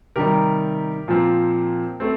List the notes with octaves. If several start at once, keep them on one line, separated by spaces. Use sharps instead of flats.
C3 D#3 G3 G4 A#4
A#2 F3 C4
A3 C4